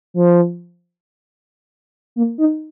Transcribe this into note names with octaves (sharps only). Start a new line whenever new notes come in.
F3
A#3
D#4